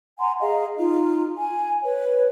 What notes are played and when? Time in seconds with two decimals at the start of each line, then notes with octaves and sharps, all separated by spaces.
0.19 F#5 G#5 A#5 C6
0.40 G#4 D#5 F5 A#5
0.77 D#4 F4
1.38 G#5
1.83 B4 C#5